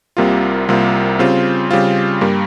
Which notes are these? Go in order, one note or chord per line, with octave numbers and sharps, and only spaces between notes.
C2 C3 G3 A#3 F4
C2 C3 G3 A#3 F4
C#3 G3 C4 F4
C#3 G3 C4 F4
G2 G3 A#3